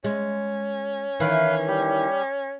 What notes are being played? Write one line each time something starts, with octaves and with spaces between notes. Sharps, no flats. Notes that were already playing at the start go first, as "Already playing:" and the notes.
G#3 C#4
D#3 E3 B4 F5
G3 G4